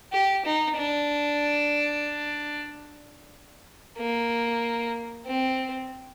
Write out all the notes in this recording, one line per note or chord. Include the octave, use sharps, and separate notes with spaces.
G4
D#4
D4
A#3
C4